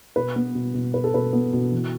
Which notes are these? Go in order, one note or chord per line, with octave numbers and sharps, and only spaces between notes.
B2 B4
B3
B2
B2
B2 B4
A4
B2 B4
B3
B2
E3